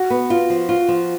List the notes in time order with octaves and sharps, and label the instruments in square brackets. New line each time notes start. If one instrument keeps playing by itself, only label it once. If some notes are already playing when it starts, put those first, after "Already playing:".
Already playing: [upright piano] F#4
[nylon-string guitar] B3
F4
F3
F4
F3